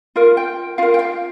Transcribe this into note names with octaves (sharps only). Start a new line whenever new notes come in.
F4 A#4 F5
G5
F4 A#4 F5
G5
F5